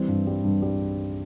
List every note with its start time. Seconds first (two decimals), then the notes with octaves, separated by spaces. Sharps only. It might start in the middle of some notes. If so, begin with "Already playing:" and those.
Already playing: E3 G3 C4
0.08 G2
0.27 G3
0.44 G2
0.62 G3